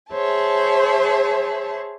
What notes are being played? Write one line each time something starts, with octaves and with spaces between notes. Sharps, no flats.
G#4 C5 C#5 E5 A5